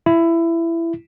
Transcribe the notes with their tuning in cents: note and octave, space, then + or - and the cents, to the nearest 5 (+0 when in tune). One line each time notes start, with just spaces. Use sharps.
E4 +20